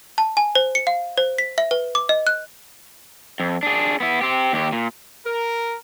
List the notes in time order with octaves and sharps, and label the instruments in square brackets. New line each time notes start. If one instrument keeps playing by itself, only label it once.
[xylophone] A5
G#5
C5
C#7
F5
C5
B6
E5
B4
D6
D#5
F#6
[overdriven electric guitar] F2
D4 G#4
B3 E4
C4 G4
D#2 G4
A#2
[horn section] A#4